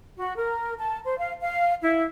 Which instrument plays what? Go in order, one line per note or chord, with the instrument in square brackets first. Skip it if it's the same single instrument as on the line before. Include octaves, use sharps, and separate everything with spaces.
[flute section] F#4
A#4
A5
C5
F5
F5
E4